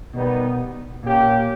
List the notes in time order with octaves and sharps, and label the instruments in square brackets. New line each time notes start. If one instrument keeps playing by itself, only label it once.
[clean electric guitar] B2 [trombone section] D#3 G3 B3 D#4
[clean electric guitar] A#2 [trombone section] A#3 C#4 G4